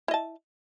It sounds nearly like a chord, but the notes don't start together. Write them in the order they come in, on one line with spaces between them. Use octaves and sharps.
E4 D#5 A5